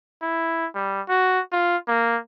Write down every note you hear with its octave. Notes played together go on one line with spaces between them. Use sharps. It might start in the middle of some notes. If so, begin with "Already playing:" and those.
E4
G3
F#4
F4
A#3